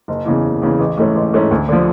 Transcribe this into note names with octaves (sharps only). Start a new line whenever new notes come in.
F#1
E2 C#3 E3
F#1
E2 C#3 E3
A1
G#2 E3 A3 C#4
A1
G#2 E3 A3 C#4
D2
D3 F3